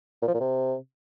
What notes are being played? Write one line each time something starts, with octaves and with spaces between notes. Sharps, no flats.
A#2
F3
A#2
C3